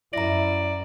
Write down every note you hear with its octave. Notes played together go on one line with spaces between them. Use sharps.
F#2 E4 D5 A#5 A#6